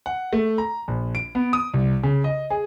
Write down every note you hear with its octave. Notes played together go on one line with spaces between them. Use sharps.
F#5
A3
A#5
A#1
D7
B3
D#6
C2
C#3
D#5
G#4